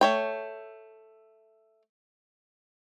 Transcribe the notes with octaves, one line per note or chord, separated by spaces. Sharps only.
A3 C#5 G5